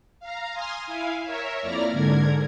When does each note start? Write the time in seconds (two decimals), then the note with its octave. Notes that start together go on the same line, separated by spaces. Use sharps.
0.20 F5 A#5
0.53 G#5 C6 D#6 F6
0.87 E4 F5 G#5
1.23 A#4 C#5 E5
1.63 F2 A#3 E4 D5 A#5 F6
1.92 G#2 D3 A#4 G#6